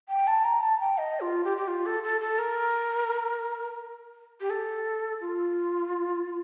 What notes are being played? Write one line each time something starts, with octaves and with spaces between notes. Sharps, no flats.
G5
A5
A#5
A5
G5
D#5
F4
G4
G4
F4
A4
A4
A4
A#4
G4
A4
F4